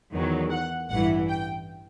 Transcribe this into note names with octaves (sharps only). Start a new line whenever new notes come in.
E2 D#3 F#3
F#5
A1 G2 E3 F#5
G5